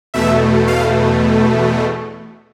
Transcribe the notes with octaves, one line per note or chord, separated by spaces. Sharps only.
E2 B2 A3 E5
F5